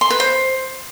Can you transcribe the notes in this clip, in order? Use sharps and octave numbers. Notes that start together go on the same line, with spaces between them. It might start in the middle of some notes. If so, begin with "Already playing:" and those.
C6
B4
C5